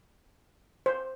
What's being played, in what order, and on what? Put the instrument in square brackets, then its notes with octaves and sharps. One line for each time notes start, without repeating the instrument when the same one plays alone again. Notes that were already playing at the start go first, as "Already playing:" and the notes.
[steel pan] C5